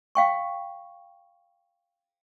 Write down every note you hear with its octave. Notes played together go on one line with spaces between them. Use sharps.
F5 G5 C#6